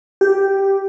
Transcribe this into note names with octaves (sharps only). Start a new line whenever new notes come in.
G4